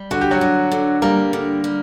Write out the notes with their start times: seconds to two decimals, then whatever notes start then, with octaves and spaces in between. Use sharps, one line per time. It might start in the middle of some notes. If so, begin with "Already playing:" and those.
Already playing: G3
0.11 D3 F#4
0.21 G4
0.31 F#3 F#4
0.41 D3
0.72 D3
1.02 G3 A#3 A#4
1.33 D3
1.64 G3